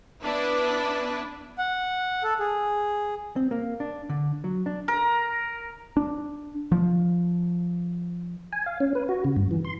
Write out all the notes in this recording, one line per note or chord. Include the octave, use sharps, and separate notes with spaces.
B3 D4 E4 B4
F#5
A4
G#4
C4
A#3
D4
D3
F#3
D4
A#4
D4
F3
G#5
F5
C#4
B4
F#4
C#3
G2
E3
C6